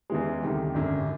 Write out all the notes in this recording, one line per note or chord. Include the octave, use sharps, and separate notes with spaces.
E2 C#3 E3 G#3
D2 C3 D#3 G3
G#1 F#2 D3